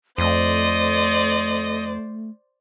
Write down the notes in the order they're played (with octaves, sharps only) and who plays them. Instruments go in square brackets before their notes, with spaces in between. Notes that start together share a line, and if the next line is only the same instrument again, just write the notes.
[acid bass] F2 [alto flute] A3 [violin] C5 D5 [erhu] D#5